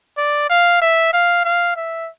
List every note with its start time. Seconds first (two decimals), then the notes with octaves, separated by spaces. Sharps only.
0.17 D5
0.50 F5
0.81 E5
1.13 F5
1.45 F5
1.76 E5